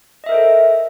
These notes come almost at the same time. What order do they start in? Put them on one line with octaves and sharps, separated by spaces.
D#5 E5 A#4 C5 A4